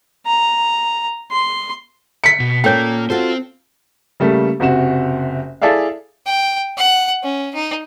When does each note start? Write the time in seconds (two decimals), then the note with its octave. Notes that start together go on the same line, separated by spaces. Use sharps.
0.26 A#5
1.32 C6
2.24 B6 C#7
2.40 B2
2.64 A#2 A#3 C#4 A4 C#5 G5
3.10 C4 F4 F#4 A4 C5
4.20 C#3 G3 A3 A#3
4.60 F#1 C3 F#4 E7
5.62 E4 G#4 A4 D5 E5 F5
6.26 G5
6.77 F#5
7.23 C#4
7.55 D#4